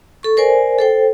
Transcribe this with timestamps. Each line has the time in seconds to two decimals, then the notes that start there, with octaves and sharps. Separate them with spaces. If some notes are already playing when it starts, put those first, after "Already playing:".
0.23 A4 C#6
0.37 A#4 C5 D5 G#5
0.79 A4 C5 G5